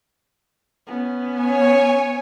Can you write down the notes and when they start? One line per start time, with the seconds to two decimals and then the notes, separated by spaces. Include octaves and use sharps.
0.87 B3 C#4
1.39 C#5 G#5